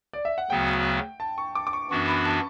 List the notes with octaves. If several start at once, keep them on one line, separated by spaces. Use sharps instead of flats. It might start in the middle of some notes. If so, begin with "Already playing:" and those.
D5
E5
F#5
D2 C#3 F#3 B3 F#4 G5
A5
C#6
D6
D6
C#6
F#2 E3 B3 D4 F#4 C#6
B5
A5